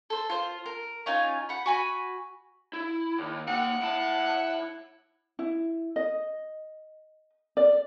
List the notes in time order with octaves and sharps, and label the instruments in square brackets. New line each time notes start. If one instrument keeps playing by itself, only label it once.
[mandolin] A4 C5
F4 C5
A#4
C#4 D#4 F4 G#5
F#5 B5
F#4 G#5 B5
[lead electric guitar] E4
D#2
[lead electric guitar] A#3 G5 [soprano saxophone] F#5
[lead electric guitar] E4 A5
[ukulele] E4
D#5
D5